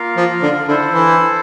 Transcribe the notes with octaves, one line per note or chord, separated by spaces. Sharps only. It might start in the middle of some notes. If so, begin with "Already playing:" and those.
Already playing: A#3 F4 A#4 F5
F3
D3
D3 E4 A4 C5
E3